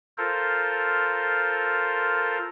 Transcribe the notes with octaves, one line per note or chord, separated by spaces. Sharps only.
F4 A4 A#4 C5